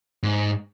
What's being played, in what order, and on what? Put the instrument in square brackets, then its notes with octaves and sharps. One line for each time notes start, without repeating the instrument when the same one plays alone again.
[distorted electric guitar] G#2